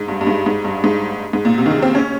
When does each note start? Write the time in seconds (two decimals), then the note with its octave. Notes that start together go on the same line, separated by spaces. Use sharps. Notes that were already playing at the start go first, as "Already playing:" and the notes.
Already playing: G#2
0.08 G2
0.21 G2
0.27 G#2
0.46 G#2
0.65 G2
0.84 G#2
1.33 G#2
1.45 A#2
1.58 C3
1.66 D#3
1.71 C#3
1.82 C4
1.95 C#4